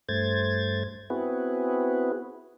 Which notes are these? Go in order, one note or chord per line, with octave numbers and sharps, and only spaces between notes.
G2 A3 C5 G#6 A6
B3 C4 E4 F#4 G#4 B4